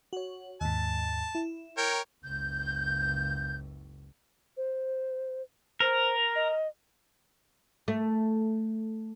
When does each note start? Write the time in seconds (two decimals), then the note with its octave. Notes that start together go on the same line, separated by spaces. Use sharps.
0.13 F#4 C#5
0.61 D#2 G#2 A5
1.35 E4
1.77 A#4 C#5 G5
2.24 F#1 C#2 G6
4.57 C5
5.80 A#4 C5
6.35 D#5
7.88 A3